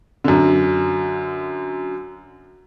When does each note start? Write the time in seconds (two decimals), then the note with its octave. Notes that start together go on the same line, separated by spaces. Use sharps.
0.24 F#2 D3